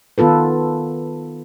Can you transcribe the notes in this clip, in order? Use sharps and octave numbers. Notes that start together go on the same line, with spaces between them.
D#3 B3 F4 A4 B4